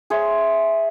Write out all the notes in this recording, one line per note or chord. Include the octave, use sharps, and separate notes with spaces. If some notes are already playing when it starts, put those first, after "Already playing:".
G#4 C5 C#5 E5